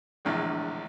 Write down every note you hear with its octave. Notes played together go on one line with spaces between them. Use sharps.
A#1 E2 A2 D3 G#3